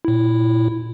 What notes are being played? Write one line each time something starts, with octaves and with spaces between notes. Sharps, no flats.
A#2 E4